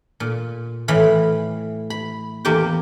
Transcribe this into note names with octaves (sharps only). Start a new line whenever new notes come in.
A#2
A2 E3 F5 B5
B5
E2 A#3 G4 G5